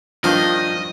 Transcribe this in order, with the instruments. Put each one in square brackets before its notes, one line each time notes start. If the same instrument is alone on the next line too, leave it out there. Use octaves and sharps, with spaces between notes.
[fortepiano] G2 D4 [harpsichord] D#3 F5 [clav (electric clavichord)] F3 [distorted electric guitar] D#5